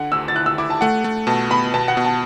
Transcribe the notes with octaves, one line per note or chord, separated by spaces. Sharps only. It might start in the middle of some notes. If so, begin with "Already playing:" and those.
Already playing: D3 F#5
D2 E6
A6
E4 F#6
E6
E4 D6
A5
A3 F#5
A3
B2 A5
B3 B5
B2 A5
F#5
B2
A5